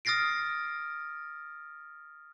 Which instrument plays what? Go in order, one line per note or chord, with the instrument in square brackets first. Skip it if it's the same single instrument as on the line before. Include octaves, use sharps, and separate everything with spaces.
[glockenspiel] D#6 F6 A6 A#6 C7 D7